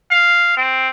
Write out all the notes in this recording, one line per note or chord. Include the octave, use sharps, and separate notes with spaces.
F5
C4